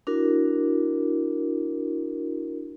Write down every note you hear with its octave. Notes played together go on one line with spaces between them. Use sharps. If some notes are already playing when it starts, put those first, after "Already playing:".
D4 E4 F#4 A#4